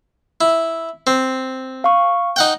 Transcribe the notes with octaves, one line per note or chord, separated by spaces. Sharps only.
E4
C4
F5 C#6
D#4 F#5 G5